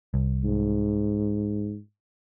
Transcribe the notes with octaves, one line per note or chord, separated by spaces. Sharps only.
C2
G#2